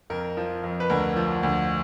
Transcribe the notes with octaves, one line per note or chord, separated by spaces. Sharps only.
F2 A#4
F3
F2
B4
D2 A#4
F3
D2